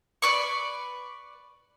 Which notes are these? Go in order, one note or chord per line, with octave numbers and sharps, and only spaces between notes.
B4 D5 C#6